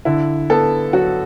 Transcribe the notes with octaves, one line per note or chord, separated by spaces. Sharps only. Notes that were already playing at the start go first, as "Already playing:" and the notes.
D3 E4
B3 A4
F#3 F#4